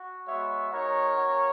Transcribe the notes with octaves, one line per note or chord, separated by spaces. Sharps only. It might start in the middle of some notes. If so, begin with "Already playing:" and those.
Already playing: F#4
G#3 B3 F#4 C#5 E5
G#3 D#4 F#4 A#4 C#5
A#3 C#4 F#4